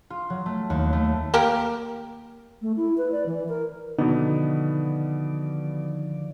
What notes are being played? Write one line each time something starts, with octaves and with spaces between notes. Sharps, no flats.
F4
F#3
A3
D#2
A3
A#3 G4 A#4
A3
E4
B4
D5
E3
A#4
B2 D3 D#3 F3 B3 D#4 D5